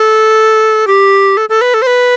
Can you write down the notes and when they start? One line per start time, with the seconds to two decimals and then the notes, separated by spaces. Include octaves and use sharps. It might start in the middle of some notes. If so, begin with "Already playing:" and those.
Already playing: A4
0.87 G4
1.37 A4
1.49 A4
1.61 B4
1.74 A4
1.82 C5
1.87 B4